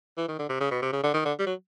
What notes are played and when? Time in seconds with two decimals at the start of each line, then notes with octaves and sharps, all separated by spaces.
0.17 E3
0.28 D#3
0.39 D3
0.49 C3
0.61 C#3
0.71 B2
0.82 C3
0.93 C#3
1.03 D3
1.14 D#3
1.25 D3
1.39 G3
1.46 F#3